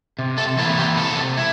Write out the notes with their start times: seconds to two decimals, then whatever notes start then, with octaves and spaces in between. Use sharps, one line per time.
0.19 C3
0.38 A4
0.57 E3 A#3 E4 A4
0.78 G4
0.97 C3 A4
1.37 E4